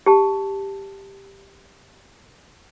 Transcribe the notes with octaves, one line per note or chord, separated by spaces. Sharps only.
G4 A5